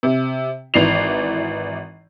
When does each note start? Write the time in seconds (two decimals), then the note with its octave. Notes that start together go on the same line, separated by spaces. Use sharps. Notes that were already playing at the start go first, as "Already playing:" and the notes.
0.03 C3
0.74 G#1 E3 D5 C7 F7